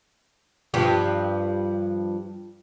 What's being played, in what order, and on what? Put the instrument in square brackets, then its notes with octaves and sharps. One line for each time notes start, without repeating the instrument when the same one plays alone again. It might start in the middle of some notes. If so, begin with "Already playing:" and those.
[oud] G2 F3 G4